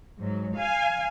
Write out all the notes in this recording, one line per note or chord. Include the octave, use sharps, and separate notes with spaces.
G#2 F#3
F5 G#5